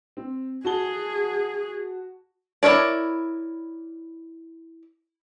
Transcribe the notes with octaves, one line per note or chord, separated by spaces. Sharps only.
C4
F#4 G#4 A5 G7
E4 A#4 C#5 D5